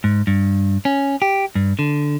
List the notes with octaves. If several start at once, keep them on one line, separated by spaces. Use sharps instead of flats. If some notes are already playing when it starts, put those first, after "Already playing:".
G#2
G2
C#4
G4
G2
D3